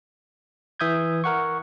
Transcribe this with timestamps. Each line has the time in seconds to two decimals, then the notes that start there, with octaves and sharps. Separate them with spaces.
0.80 E3 E5 D#6 G6 G#6
1.24 A#4 F#5 C#6